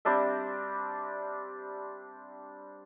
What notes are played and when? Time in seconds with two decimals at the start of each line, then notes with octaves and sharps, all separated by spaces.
0.05 G3 C4 D4 E5